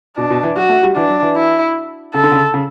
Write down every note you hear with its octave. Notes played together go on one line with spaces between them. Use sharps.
B2 D4
B2
E3
F#3 F#4
A3
G3
E3 D4
F#3
E3
E4
C#3 A4
D3
C#3
C#3